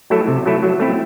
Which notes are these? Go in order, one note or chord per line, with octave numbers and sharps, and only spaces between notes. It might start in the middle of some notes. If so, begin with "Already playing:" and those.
F#3 A3 E4 A4
C3
F#3 A3 E4 A4
F#3
A3 C4 E4